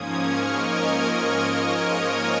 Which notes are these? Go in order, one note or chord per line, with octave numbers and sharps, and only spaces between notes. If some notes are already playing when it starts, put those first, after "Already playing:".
Already playing: G#2 F3 A#3 C#4 D#6 G#6
C#6 F6
A#4 D#5
C#5